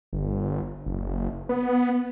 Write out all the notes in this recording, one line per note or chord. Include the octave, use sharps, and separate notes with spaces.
G1
F#1
B3